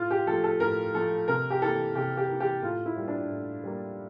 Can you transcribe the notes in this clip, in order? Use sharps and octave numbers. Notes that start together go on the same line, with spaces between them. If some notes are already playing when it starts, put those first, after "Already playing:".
Already playing: A2 F4
G4
F3 A3 A4
A4
A2 A#4
F3 A3 A4
C3 A#4
G4
E3 A#3 A4
C3 G4
G4
E3 A#3
G4
A2 F4
E4
G3 A#3
D4
A2
G3 A#3